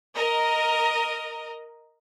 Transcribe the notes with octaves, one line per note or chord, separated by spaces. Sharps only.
A#4 D#5